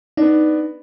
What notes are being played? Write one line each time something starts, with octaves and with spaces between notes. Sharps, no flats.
B3 D4 D#4